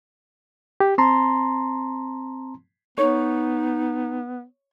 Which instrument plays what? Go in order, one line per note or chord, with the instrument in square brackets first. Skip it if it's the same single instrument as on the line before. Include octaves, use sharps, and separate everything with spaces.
[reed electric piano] G4
C4 A5 A#5 C6
[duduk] B3 [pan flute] D#4 [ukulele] C#5